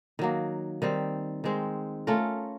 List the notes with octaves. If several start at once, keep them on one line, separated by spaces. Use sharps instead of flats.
D#3 F#3 A#3
D#3 G3 C4
D#3 G#3 C4
A3 C#4 F4 A#4